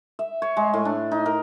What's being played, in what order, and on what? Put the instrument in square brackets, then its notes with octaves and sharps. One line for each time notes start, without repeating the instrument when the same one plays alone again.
[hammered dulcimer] E5
C#5
G#3
A2
D4
D#4
A#4